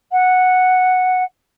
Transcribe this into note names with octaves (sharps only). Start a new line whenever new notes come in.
F#5